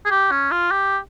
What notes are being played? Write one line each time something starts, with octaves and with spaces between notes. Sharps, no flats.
G#4
G4
C#4
F4
G4